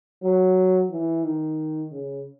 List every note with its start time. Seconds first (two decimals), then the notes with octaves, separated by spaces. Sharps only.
0.23 F#3
0.91 E3
1.24 D#3
1.91 C#3